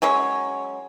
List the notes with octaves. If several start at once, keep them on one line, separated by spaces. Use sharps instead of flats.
F#3 G#3 C#4 C#5